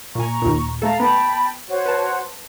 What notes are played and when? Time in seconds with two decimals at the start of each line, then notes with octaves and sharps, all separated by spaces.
0.15 A#2 G#5 A#5 C#6
0.42 D#2 A#2
0.82 A3 A4 F5 A5 A#5
1.00 B3 G5 A5 B5
1.68 F#4 C5 C#5
1.86 B4 A5